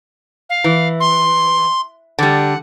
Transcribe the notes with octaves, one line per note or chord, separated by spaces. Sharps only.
F5
E3
C6
D3 G3 F#5